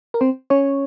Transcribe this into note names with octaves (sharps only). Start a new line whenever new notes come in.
A#4
C4 C5
C#4 C#5